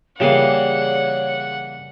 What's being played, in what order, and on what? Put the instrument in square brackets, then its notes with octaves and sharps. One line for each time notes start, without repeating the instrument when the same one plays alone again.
[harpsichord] C#3 E3 A#3 [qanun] G3 G#4 D6 [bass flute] C#5 [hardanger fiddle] F#5